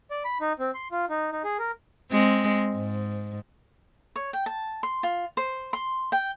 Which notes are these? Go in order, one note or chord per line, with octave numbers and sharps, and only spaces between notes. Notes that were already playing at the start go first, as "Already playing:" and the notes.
D5
B5
D#4
C4
C6
F4
D#4
D#4
G#4
A#4
G#3 C4
G#2
C#5
G5
A5
C6
F4
C5
C6
G5